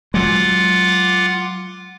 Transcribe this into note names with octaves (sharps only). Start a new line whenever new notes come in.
F#3 G#3 F4 F#5 D6